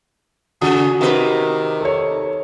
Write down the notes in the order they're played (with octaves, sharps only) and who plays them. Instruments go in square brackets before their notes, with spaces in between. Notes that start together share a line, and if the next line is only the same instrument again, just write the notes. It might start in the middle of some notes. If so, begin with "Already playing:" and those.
[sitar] C#3 [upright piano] F#4 [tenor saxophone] G#4
[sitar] C3 B4 [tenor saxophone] D#3
[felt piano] A4 C#5